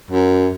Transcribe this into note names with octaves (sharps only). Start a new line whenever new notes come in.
F#2